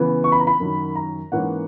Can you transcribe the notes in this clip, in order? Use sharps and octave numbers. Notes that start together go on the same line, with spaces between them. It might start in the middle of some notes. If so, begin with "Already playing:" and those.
Already playing: C#3 E3 B3
C#6
B5
A#5
B5
F#2 D#3 F#3
A#5
G#2 E3 A#3 C#4 F#5